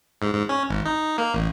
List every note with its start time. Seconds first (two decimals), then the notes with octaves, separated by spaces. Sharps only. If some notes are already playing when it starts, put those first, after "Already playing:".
0.22 G#2
0.33 G#2
0.49 C#4
0.69 G#1
0.85 D#4
1.18 A#3
1.34 A1